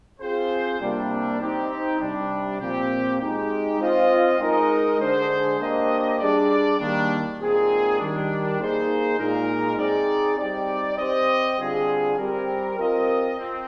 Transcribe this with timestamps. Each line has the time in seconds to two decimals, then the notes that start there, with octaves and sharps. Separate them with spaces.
0.20 C4 F4 G#4 C5
0.80 C3 G3 A#3 D4
1.40 C4 D#4 G4
2.00 C3 G3 D4
2.60 A#2 F3 C4 G4
3.20 G#3 D#4 G4
3.80 C4 F4 C5 D#5
4.39 G#3 D#4 A#4 D#5
4.99 D3 G#3 D4 G#4 C5
5.59 A#3 D4 G4 C5 D#5
6.19 G3 D4 G#4 D5
6.79 D#3 G3 A#3 D4
7.39 A#2 G#3 C4 D#4 G#4
7.99 D#3 G3 D4
8.59 A#3 D#4 G#4 C5
9.18 A#2 G#3 D#4 A#4
9.78 C4 D#4 G#4 D5
10.38 G3 C4 D#4 G4 D5
10.98 C4 G4 C5 D#5
11.58 D3 G3 C4 F4 G#4
12.18 G3 C4 G4 A#4
12.78 C4 F4 A#4 D#5
13.38 C4